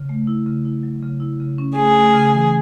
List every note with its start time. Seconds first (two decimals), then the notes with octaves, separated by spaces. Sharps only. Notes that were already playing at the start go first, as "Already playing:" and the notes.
Already playing: C#3
0.09 A3
0.27 E4
0.47 C#3
0.65 E4
0.83 F#3
1.02 C#3
1.20 E4
1.40 C#3
1.58 C#4
1.76 A3 G#4
1.95 A3
2.14 C#3
2.32 E3